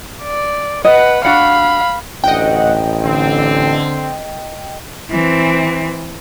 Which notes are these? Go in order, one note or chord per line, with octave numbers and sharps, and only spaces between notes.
D5
B4 D#5 F#5
D4 F#4 F5 F#5 B5
A1 D2 D#5 F#5 G5
D3 C4
E3 C4